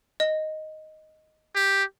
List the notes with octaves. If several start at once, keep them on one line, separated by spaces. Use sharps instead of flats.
D#5
G4